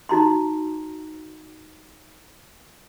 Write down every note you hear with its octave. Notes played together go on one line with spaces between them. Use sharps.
D#4 F#4 A#5 C6